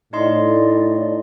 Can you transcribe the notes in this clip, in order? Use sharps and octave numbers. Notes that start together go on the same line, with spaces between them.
A2 D#4 D5 D#5 C6